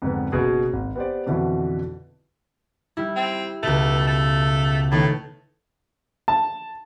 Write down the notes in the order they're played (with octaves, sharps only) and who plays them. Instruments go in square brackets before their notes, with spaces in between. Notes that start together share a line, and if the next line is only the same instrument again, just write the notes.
[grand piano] F2 G#2 D3 B3
F#1 B2 G#4
G#1
B3 G4 C5 D5
F2 B2 D3 E3 E4
[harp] G3 E4
[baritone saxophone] C4
[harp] C#2 B2 [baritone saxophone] A3
[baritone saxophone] A3
[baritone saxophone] A2 [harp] D#3 A3 B3
[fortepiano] A5